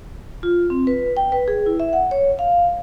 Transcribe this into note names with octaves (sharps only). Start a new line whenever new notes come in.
F4
C4
B4
G5
B4
G#4
E4
E5
F#5
C#5
F5